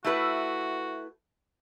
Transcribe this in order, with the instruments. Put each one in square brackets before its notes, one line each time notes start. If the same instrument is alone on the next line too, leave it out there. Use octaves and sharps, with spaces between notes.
[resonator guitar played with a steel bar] A3 E4 B4 [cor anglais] F#4